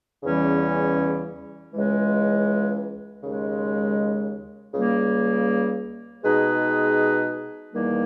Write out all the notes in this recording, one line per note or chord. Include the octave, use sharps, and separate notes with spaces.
E2 C#3 E3 G3 C#4
C#2 C#3 E3 G#3
D#2 C#3 G#3
C#2 C#3 G3 A#3
B2 G#3 D#4 G#4 B4
E2 D#3 G3 A#3